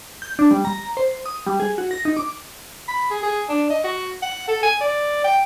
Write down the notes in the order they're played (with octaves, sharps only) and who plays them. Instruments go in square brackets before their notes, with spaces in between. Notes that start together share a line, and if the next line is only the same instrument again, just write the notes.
[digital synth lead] G6
D4
G3
A#5
C5
D#6
G3
G#4
F#4
A#6
D#4
D6
[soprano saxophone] B5
G#4
G#4
D4
D#5
F#4
F#5
A4
G#5
D5
G5